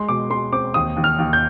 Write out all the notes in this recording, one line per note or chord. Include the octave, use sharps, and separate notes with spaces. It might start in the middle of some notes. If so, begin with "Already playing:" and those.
Already playing: G#3 C6
B2 D6
G#3 C6
C4 D6
D#2 D#6
D#2
F6
D#2
G6